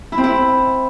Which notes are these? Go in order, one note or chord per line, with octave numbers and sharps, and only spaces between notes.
E4
C4
E4